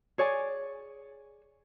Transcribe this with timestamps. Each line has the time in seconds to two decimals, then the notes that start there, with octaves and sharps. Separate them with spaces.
0.18 G#4 C#5 D5 G#5